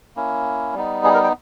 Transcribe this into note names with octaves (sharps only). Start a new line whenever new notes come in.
A#3 C#4 E4
G3 B3 D#4
G#4
A#4
G5